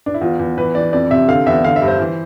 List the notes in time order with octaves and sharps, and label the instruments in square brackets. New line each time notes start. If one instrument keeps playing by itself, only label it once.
[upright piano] D4
E4
E2 F4
E2
E3 B4
E3 D5
F2 D5
C3 E5
D3 F5
E2 E5
D3 F5
E5
G2
C5
E3